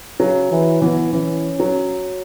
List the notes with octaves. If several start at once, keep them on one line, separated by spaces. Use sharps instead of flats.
C#3 F#3
E3
E3 B3
E3 C#4
F#3